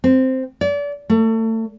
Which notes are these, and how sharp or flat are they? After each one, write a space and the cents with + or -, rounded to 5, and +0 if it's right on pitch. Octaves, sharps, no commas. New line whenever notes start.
C4 -5
D5 -35
A3 +30